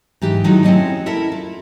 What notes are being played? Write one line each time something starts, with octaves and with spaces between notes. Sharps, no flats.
G#2 E3 G4
D#3 F#3 G#3 D#4 E4
C4 C#4 E4 A4 D#5
E4 A4 A#4 E5
F4